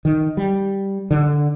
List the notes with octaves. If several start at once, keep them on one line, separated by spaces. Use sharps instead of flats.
D#3
G3
D3